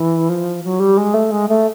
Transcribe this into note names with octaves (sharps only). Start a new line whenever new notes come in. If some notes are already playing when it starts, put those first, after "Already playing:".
Already playing: E3
F3
F#3
G3
G#3
A3
G#3
A3